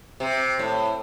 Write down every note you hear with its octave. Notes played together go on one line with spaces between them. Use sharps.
C3
A2